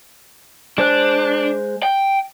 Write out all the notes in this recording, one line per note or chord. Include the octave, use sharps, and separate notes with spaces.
G#3 D4 C5 F#6
G5